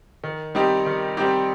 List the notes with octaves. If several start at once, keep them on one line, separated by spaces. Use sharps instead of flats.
D#3
G3 C4 D#4 G4
D#3
G3 C4 D#4 G4